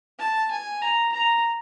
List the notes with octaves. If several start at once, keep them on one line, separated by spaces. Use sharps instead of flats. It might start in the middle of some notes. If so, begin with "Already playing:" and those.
A5
G#5
A#5
A#5